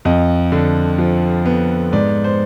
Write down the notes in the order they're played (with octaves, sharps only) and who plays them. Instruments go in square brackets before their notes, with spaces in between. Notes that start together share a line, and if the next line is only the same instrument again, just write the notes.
[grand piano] F2 D#5
D3
F3
B3
G#2 D5
C5